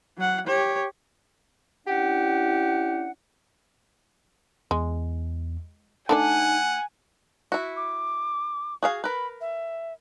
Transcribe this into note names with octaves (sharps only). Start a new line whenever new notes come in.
F#3 F#5
G4 C#5
C#4 D4 E4 G4 F#5
E2 G#3
A3 D4 D#4 D5 F#5 G#5
E4 F#4
D6
F#4 G#4 F5
A#4 B4 B5
E5